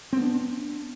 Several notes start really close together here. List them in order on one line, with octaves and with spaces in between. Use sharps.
C4 B3 D4